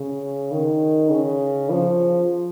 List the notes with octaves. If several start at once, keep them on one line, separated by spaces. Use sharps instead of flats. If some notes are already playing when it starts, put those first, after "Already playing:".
Already playing: C#3
D#3
C#3
F3